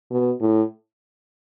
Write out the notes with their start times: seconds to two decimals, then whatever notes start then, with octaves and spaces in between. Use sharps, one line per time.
0.11 B2
0.41 A2